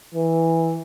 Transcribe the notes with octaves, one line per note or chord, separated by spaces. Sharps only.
E3